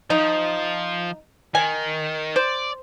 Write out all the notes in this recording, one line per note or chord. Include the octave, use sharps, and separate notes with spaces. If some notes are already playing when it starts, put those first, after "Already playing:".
F3 D#4
D#3 G#5
C5 D5